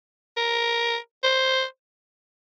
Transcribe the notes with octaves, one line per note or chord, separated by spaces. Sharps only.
A#4
C5